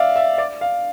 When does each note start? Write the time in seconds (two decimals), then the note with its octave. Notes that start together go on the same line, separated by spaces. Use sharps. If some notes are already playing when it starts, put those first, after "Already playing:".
Already playing: D5 E5 F5
0.16 E5
0.38 D5
0.61 F5